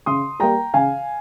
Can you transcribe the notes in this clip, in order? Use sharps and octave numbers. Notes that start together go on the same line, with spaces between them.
C#3 C6 D#6
G3 A#3 G5 A#5
C#3 F5 G#5